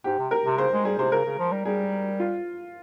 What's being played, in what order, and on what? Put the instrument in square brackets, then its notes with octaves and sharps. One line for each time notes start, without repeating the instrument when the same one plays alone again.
[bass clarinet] G#2 [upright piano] G4
[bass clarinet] C3
[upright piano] A#4
[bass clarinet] C3
[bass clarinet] C#3 [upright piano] C5
[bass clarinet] G#3
[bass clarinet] G3 [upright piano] G#4
[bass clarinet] C3 [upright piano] C5
[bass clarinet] C#3 [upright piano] A#4
[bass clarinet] C#3
F3
G3
[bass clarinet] G3 [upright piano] G#4
[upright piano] F4